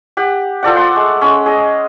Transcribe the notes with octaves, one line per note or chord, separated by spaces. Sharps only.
G4 F#5
F3 A4 D5 F#5
F#5 C6 E6
G#3 A3
G#3 C#4
G#4 D#5